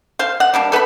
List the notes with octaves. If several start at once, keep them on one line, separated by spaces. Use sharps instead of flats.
C5 F5
F#5
G3 A#3 D4
A4 B4 F5 B5